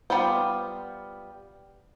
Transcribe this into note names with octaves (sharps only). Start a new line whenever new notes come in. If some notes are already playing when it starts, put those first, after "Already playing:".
G3 B3 F4 C5